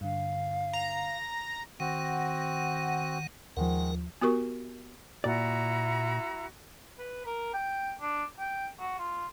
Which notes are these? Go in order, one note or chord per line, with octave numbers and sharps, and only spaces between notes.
G2 D3 F5
A#5
D#3 C4 F#4 F#5
D#2 D#3 F3 G#3 A#4 F#5
B3 F#4 G4 A#4 C#6
A#2 E4 F#4 D5 A#5
B4
A#4
G5
D4
G5
F#4
F4